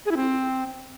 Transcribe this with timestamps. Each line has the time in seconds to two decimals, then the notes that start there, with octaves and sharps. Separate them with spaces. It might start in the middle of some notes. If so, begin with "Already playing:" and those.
0.06 G#4
0.11 E4
0.16 C4